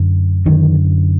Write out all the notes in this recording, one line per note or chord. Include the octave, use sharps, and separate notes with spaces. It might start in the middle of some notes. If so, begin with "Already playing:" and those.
Already playing: F#2 D3
F#2 D3 D#3